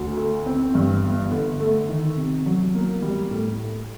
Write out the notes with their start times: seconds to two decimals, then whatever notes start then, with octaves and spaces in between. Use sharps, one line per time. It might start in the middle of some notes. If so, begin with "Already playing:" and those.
Already playing: D2
0.17 A3
0.46 C4
0.75 G2
1.03 G1
1.31 D3
1.60 A3
1.89 D#3
2.16 C3
2.46 F#3
2.74 A#3
3.02 G3
3.31 A2